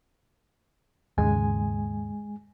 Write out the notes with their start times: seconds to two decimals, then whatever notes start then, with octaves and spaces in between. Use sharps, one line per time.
1.18 D#2 G#2 C#3 G#3 G#5